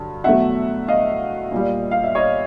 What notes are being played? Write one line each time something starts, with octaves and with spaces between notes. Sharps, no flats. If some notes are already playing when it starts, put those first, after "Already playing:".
Already playing: G2 D3 F#3
E2 B2 F#3 A3 E5 F#5
D#5 F5
A#2 G3
F5
E5
C#5 D#5